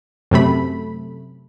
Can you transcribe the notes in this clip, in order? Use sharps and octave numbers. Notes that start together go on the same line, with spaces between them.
F#2 C3 A3 B5